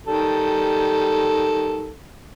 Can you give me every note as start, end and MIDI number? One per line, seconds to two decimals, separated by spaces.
0.07 1.94 51
0.07 1.94 55
0.07 1.94 69